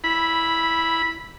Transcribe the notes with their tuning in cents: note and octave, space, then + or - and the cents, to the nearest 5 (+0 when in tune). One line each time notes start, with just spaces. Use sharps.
E4 +0 B5 -10